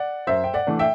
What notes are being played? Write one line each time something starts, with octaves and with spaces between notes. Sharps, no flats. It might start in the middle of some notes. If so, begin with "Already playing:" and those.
Already playing: D5 F#5
F#2 C5 E5
G5
D5 F#5
E3 A3 D4
E5 G5